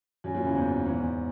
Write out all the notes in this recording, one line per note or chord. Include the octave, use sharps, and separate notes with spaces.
F#2
F#2 A#2
C#3 E3
E2 G#2
E2 G#2
E2